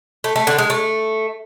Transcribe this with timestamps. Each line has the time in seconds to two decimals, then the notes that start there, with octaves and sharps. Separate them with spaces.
0.24 A3
0.36 A3
0.47 D3
0.58 G#3
0.70 A3